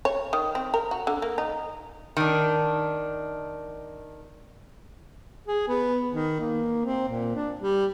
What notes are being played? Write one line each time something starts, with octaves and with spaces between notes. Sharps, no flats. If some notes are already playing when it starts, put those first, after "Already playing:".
C#5
D#3
C4
A#4
F#4
D3
A#3
D#4
D#3 D4
G#4
B3
D#3
A#3
C4
A#2
D4
G3